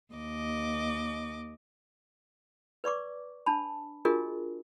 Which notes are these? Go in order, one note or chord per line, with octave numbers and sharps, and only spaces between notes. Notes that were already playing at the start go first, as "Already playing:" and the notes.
D#2 D#5 D6
B4 D5 C#6 D6
D4 A5 B5
D4 F4 F#4 G#4 A#4 D#5